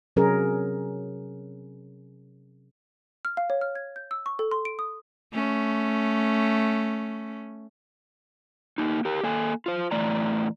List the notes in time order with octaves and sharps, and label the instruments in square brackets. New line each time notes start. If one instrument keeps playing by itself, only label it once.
[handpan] C3 F#3 C#4 G#4 A#4
[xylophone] F6
F5
C#5
F6
G#6
G6
E6
C#6
A4
C6
D7
D#6
[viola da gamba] A3 C#4
[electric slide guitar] A3 A#3 D#4
G4 A#4
A#3 A4 G#5
F4 C5
E2 A2 E3 A3 D5 A#5